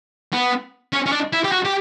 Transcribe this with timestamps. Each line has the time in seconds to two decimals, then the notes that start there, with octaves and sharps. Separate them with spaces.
0.33 B3
0.93 C#4
1.06 C#4
1.12 D4
1.33 E4
1.44 G4
1.52 F#4
1.65 G4